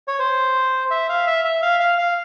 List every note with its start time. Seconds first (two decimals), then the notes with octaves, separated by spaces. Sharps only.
0.08 C#5
0.19 C5
0.91 E5
1.09 F5
1.27 E5
1.44 E5
1.62 F5
1.80 F5
1.98 F5